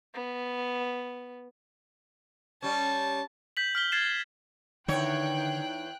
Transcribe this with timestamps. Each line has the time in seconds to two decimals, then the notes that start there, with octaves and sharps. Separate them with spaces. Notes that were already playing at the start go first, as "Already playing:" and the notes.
0.14 B3
2.63 G3 C#4 A5
3.57 G6 B6 F#7
3.75 F6 B6 G7
3.92 F6 G#6 A6 C7 E7
4.88 E2 D3 D#3 D#4 C#5 G5 F#6